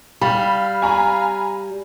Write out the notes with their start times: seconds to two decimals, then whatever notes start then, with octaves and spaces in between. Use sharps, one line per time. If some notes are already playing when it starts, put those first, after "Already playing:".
0.22 G3 F5 B5
0.82 G#5 A#5 B5